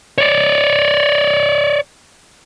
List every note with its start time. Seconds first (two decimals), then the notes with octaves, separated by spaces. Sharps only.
0.18 C#5 D5